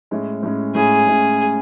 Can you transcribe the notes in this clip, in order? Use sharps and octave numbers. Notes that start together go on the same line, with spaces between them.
A2 G#3 C#4
A2 G#3 C#4
A2 G#3 C#4 G#4
A2 G#3 C#4